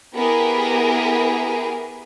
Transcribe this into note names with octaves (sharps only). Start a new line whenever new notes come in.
B3 E4 G4 G#4 A#4